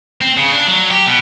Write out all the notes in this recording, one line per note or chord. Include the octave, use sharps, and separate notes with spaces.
C4
C#3
D4
F#3
G4
B2